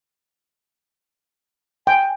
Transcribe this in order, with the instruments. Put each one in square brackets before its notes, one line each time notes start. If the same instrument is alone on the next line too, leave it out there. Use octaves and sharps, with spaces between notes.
[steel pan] G5 [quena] G#5